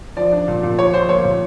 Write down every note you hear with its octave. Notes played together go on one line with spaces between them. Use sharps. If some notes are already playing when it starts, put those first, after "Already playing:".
F3 D5
D4
A#2
A#2
F3 C#5
F3 C5
A#3 C#5
A#2